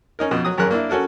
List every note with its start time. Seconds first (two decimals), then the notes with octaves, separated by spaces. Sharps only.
0.19 C#4 D#4 A#4
0.31 F2 B2 D#5
0.45 F#3 D#6
0.58 G#1 F#2 G#4 A#4 F#6
0.71 A#3 D4 E4
0.90 C#4 F#4 A4 A#4